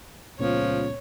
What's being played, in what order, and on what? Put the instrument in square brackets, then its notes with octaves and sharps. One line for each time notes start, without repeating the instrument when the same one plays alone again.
[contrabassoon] C#2 [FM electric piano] A#2 B3 [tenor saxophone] F3 [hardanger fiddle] C#5